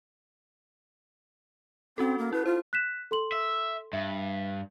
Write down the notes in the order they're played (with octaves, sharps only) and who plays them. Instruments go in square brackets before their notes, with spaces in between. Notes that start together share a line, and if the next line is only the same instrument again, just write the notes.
[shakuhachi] C4 [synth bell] C#4 F#4 A4
[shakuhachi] A#3
[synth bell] E4 [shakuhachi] B4
[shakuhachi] F4 [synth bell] C5
[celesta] F#6 B6 E7
A4 C6 F#7
[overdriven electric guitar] E5
[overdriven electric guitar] G2 [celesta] E5